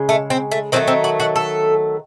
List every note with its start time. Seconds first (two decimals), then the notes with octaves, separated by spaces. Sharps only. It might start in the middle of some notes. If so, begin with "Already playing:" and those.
Already playing: C#3 G#3
0.09 A3
0.30 C4
0.51 A3
0.72 D#3 F#3 A3 C4
0.87 C4
1.04 F#4
1.20 F#4
1.36 A4